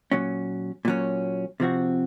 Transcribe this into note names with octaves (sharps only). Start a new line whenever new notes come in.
A#2 F#3 C#4
A#2 F#3 C#4
C3 F3 C4 F#4